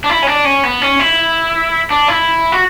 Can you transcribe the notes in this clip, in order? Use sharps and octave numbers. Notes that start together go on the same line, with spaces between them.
D4
E4
C#4
D4
C#4
B3
C#4
E4
D4
E4
F#4